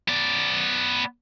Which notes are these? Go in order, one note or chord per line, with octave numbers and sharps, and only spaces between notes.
B3 D5